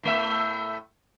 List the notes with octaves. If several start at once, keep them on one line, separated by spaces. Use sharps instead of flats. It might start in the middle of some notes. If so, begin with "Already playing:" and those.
A2 A3 E5